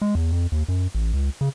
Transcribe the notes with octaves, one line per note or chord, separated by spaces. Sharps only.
G#3
E2
F2
D#2
F#2
A1
C#2
C#3